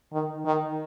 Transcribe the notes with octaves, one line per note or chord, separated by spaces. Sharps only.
D#3
D#3